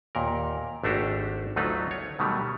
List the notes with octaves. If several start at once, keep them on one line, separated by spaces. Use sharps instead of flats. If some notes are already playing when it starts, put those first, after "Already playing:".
D#2 A#2 A#4
G#1 A3 D4 F#4 G4 C5
D2 F#3 A3 D#4 F4 B4
C#5
B2 D#3 F#3 G3 A3